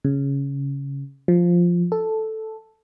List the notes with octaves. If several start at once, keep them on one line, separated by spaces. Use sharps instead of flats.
C#3
F3
A4